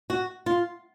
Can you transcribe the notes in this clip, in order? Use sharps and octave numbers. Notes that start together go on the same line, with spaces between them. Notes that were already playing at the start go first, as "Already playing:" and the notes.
F#4
F4